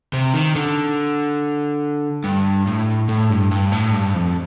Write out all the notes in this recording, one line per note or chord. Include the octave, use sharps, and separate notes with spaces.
C3
D#3
D3
G2
A2
A2
G2
G2
A2
G2
F2